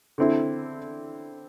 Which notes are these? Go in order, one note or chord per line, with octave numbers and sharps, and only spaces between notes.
D3 C4 E4